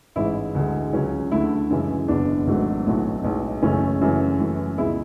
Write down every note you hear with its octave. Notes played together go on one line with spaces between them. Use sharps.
A1 G#2 G#3 E4
D2 D3 G#3
C#2 C#3 F#3 C#4
D2 D3 A3 E4
F#2 C#3 E3 G#3
F#1 E2 B2 D4
G#1 G#2 F#3 A3
B1 A2 F#3 A3
B1 A2 G#3
F#1 F#2 C#3 E3 A3 C#4
F#2 C#3 E3 A3
F#2 E3 A3
C#2 B2 G#3 E4